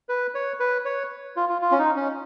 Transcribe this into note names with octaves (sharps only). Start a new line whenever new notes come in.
B4
C#5
B4
C#5
F4
F4
F4
C#4
D#4
C#4